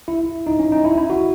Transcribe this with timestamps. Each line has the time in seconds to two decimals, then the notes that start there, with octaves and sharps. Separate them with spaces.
0.08 E4
0.47 D#4
0.59 C#4
0.72 D#4
0.85 E4
0.97 E4
1.10 F#4